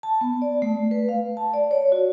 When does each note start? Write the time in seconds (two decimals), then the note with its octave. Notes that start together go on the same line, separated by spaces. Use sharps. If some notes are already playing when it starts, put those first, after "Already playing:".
0.03 A5
0.21 B3
0.42 D5
0.62 A3
0.91 B4
1.09 F5
1.37 A5
1.54 D5
1.71 C#5
1.92 F#4